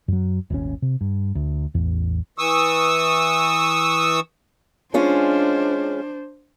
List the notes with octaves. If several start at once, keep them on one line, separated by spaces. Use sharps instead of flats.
F#2 F#3
D#1 G#1 C#4
C3
G2
D2
A1 E2
E3 C#6 D#6 E6
G#3 C#4 D4 F4 C5